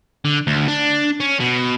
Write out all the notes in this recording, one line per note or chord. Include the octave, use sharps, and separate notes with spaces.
D3
D2
D4
C#4
B2